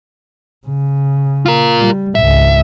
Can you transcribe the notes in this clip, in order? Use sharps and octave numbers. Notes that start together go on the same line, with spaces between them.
C#3
F4 A#4
G3
G#1 C#2 E5